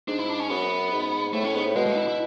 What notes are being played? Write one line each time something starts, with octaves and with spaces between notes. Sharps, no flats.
G#2 D4
E4
D4
C#4
F#2 B3
G#2
A2 A3
C#4
G#2 B3
A2
B2 G#3
G#3
E4
E4